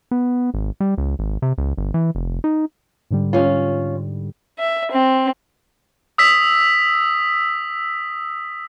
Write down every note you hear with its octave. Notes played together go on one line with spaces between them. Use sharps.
B3
G#1
G3
C#2
G#1
C3
C#2
G1
E3
F1
D#4
G#2 D3 G3
C#4 F4
E5
C4
D#6 E6 B6